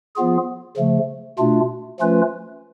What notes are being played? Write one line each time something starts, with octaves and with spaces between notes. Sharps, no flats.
F3 B3 F4 G#4
C#3 F3 A3
B2 A3 D4 F4
F3 A3 C#4 F4 B4